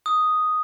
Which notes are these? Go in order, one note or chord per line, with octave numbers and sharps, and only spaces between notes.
D#6